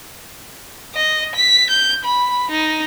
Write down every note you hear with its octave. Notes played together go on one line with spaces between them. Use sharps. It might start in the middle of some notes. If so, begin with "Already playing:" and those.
D#5
B6
G6
B5
D#4